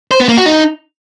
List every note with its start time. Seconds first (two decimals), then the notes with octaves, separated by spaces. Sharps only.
0.11 C5
0.20 B3
0.29 A#3
0.37 F#4
0.46 D#4